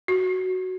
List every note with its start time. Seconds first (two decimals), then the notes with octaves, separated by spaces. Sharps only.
0.08 F#4